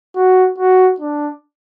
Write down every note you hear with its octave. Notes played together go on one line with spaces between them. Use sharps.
F#4
F#4
D4